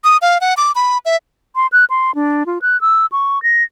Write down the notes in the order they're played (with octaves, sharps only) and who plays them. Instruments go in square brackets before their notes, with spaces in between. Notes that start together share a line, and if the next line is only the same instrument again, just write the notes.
[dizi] D#6
F5
F#5
D6
B5
E5
[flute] C6
F#6
C6
D4
F4
F#6
E6
C#6
A#6